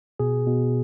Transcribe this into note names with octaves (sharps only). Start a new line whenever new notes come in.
B2 G#4
B2